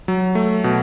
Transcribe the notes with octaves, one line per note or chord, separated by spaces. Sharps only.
F#3
A3
B2